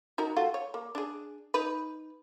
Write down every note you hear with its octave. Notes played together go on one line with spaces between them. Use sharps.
D#4 F#4 A#4
A3 F4 F#4
C#5
A#3
D4 G#4
D#4 B4